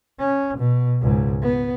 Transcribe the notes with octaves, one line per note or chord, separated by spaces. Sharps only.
C#4
B2
C#2 G#2
B3